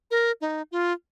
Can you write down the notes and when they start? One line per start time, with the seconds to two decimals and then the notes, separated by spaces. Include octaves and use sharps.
0.11 A#4
0.41 D#4
0.72 F4